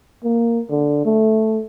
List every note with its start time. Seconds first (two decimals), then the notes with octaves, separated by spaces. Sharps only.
0.24 A#3
0.70 D3
1.05 A3